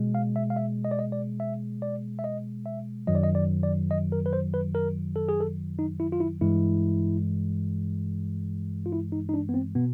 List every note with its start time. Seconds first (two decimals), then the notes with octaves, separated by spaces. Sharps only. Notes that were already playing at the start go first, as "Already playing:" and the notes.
Already playing: B2 G#3
0.15 F5
0.36 E5
0.50 F5
0.56 E5
0.85 D#5
0.91 D5
0.99 D#5
1.12 D5
1.40 E5
1.82 D5
2.19 E5
2.24 D#5
2.66 E5
3.07 F#2 D#3 F#3 D#5
3.15 D5
3.24 D#5
3.35 D5
3.63 D5
3.91 D#5
4.12 A#4
4.26 B4
4.33 C5
4.54 B4
4.75 A#4
5.16 A4
5.29 G#4
5.41 A4
5.79 D#4
6.00 E4
6.12 F4
6.20 E4
6.41 G2 E3 G#3 E4
8.86 F4
8.92 E4
9.12 D#4
9.29 D#4
9.34 D4
9.49 B3
9.54 C4
9.75 B2 B3